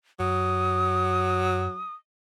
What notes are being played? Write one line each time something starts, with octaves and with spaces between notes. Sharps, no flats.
F#2 F#3 D#6